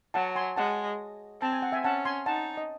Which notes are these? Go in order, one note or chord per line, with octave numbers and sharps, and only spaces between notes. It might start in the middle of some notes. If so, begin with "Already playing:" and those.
F#3 F#5 A5
G#5 C6
G#3 F#5 A5
C4 A5
G#5
F#5
E5 G#5
C#4 F#5 A5
G#5 C6
D#4 F#5 A5
D#5